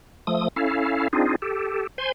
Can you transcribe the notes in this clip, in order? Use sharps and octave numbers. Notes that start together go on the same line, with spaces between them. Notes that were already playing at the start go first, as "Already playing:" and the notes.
F3 A3 D#6
C#4 E4 A4 F5
C4 D4 D#4 F4 G#4
G4 A4
C5 G#5 C6